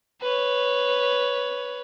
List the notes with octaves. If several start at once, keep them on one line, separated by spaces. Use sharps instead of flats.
B4 C#5